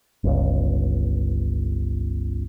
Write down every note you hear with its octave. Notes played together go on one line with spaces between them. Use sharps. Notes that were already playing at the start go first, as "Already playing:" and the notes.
G1 C#2